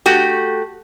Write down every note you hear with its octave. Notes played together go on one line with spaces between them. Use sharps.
A3 F#4 G4